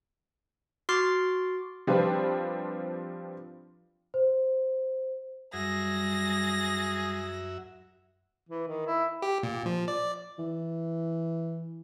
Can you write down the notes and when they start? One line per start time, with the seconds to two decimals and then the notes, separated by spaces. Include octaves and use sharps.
0.89 F#4 C6 D6 F6 A6 C7
1.87 F3 G3 C4 D4 F4 B4
4.14 C5
5.53 F#2 G3 F#4 G#4 E5 A#6
8.49 E3
8.67 D#3
8.86 E4
9.22 G4
9.43 A#2
9.66 F3
9.88 D5
10.39 E3